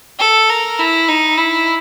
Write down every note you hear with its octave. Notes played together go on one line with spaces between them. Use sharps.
A4
A#4
E4
D#4
E4